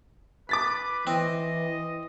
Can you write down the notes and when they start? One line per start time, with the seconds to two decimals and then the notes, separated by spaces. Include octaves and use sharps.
0.49 B4 D6 A6 B6
1.07 E3 C4 D#5